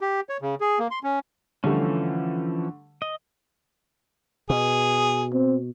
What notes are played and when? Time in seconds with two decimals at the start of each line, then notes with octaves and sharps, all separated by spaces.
0.01 G4
0.29 C#5
0.42 C#3
0.61 G#4
0.79 A#3
0.91 C6
1.03 C#4
1.64 D3 E3 F3 G3 A3 C#4
3.02 D#5
4.50 B2 G#4
5.33 C4